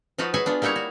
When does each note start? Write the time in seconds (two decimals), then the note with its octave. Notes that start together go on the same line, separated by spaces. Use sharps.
0.18 F3 D#4 F4 F#4 B4
0.34 F#4 G#4 B4 C#5 E5 G#5
0.46 B3 D4 F4
0.62 G3 A#3 D#4 E4 C#5 A#5
0.76 F#4